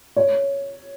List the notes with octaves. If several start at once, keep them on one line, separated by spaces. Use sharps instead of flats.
C#5